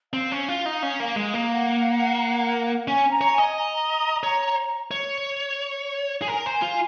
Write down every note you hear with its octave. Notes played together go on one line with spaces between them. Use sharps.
C4 F5
C#4
F4
D#4
C#4
A#3
G#3
A#3
F#5
C#4 G#5
A#5
C#5
G#5
D#5
A#5
C#5
C#5
G#4
A#4 G#5
A#5
C5 G#5
F4